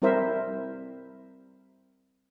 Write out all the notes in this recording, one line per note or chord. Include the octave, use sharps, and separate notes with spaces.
G3 C4 E4 A#4 C5 E5